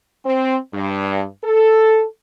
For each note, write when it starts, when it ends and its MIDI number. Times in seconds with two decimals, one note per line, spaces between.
0.25 0.56 60
0.73 1.23 43
1.44 2.05 69